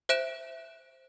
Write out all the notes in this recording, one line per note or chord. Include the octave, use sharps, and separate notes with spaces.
C5 E5 F#6 D7 E7